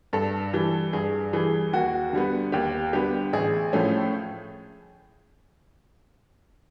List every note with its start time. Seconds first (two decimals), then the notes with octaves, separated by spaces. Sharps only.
0.13 G2 A4
0.53 E3 G3
0.93 G2 G#4
1.33 E3 G3 G#4
1.73 D#2 F#4
2.13 D3 G3 B3
2.52 D#2 G4
2.93 D3 G3 B3 G4
3.33 A1 G#4
3.73 A2 F3 A3 C#4